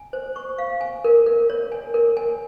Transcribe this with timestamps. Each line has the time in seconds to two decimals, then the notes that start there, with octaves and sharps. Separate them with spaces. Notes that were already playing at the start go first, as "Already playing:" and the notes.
Already playing: G#5
0.13 C5
0.36 C#6
0.58 F5
0.81 G#5
1.04 A#4
1.26 A#4
1.50 C#5
1.72 G#5
1.94 A#4
2.17 G#5